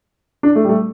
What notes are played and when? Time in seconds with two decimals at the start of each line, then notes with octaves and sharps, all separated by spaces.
0.43 D4
0.56 A3
0.65 G3
0.69 A3